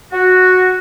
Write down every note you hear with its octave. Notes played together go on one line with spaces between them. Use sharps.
F#4